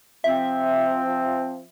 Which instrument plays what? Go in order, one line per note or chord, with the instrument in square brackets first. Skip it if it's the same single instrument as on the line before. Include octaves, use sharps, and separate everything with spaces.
[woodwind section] F3 C4 [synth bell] E5